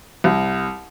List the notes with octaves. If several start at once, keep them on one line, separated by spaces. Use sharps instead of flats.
C2